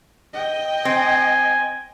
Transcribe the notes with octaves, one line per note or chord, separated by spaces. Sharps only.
D#5 G5
C4 G#5